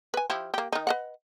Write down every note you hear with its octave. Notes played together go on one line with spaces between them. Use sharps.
B4 G#5
F3 E4 G4
A#3 G4
D#3 D#4
B4 D#5 F#5